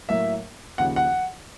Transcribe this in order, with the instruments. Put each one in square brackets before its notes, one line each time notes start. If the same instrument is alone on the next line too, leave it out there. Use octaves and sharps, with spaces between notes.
[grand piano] A2 F#3 A#3 [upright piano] E5
[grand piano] D#2 C#3 F3 [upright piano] F#5
[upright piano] F#5